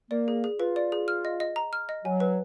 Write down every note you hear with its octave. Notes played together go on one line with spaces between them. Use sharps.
A#3 D5
G#4
G#4
F4 B4
D5
G#4
F6
D#5
D#5
A#5
F6
D#5
F#3 G#5
B4